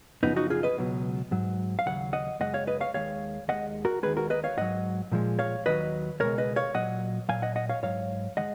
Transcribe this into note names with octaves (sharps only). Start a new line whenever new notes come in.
F#2 C#3 F3 B3 D#4
D#4 F#4
F4 G#4
B4 D#5
C#2 B2 F#3
G#2 F#3
F5
D#2 C#3 F#3 F#5
D#5 F#5
F#2 C#3 G#3 D#5 F#5
C#5 F5
B4 D#5
C#5 F5
D#2 D#3 G#3 C#5 F5
D#2 D#3 G#3 D#5 F#5
F#4 A#4
D#2 D#3 G#3 G#4 B4
F#4 A#4
B4 D#5
C#5 F5
G#2 F#3 D#5 F#5
A#2 F3 G#3
C#5 F5
D#2 D#3 F#3 B4 D#5
C#2 B2 G#3 A#4 C#5
B4 D#5
C#5 F5
A#2 F#3 D#5 F#5
A#2 F#3 F5 G#5
D#5 F#5
D#5 F#5
C#5 F5
G#2 F#3 C#5 F5
D#3 G#3 D#5 F#5